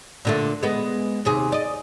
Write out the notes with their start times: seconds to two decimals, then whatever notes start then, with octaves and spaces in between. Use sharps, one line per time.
0.25 A#2 D3 A3
0.63 G#3 B3
1.25 D#2 C3 G#4
1.52 D5 D#5